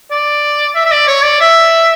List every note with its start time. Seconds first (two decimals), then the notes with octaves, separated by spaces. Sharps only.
0.11 D5
0.75 E5
0.85 E5
0.92 D5
1.07 C#5
1.24 D5
1.41 E5